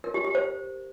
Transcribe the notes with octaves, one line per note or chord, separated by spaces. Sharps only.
A#4
G4
G4
C5